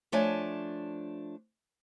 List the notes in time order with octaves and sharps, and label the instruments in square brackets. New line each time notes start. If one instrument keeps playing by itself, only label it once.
[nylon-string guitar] F3 A3 D4 C#5 E5 G#5